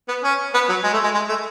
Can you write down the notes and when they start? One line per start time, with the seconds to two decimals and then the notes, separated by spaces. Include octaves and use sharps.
0.08 B3
0.24 C#4
0.54 B3
0.69 F#3
0.84 G#3
0.93 A3
1.04 G#3
1.14 G#3
1.29 A3